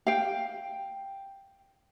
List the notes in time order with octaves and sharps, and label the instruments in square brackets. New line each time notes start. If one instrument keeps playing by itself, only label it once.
[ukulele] F5 G5